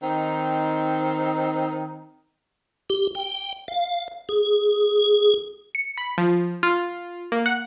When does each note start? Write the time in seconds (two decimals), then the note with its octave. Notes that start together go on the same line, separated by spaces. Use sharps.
0.03 D#3 C4 D#4
2.90 G4
3.15 G5
3.68 F5
4.29 G#4
5.75 C#7
5.97 B5
6.18 F3
6.63 F4
7.32 A#3
7.46 F#5